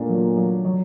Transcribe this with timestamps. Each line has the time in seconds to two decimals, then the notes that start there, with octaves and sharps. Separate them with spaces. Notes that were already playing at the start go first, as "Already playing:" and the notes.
Already playing: A#2 A3 D4
0.09 F#3
0.37 F#3
0.65 F#3